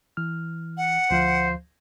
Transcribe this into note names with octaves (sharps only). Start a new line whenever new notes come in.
E3 F6
F#5
D2 F3 C5 F5